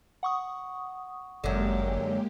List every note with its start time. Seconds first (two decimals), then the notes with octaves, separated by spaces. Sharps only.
0.23 F#5 C#6 D#6
1.44 G1 F#2 D3 G#3 A#3 G4